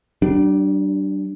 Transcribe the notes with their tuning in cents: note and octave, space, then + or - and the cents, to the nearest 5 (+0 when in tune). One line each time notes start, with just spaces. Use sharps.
G3 -40 D4 +0